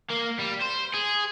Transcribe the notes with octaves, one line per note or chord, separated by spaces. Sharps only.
A#3
G3
C5
G#4